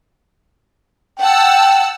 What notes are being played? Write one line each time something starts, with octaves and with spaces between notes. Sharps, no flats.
F#5 G5 A5 E6